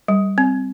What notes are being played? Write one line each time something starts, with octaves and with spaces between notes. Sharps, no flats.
G3
C4